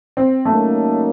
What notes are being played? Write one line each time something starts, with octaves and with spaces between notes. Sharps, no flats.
C4
C#3 F#3 A3 A#3 D#4 A#4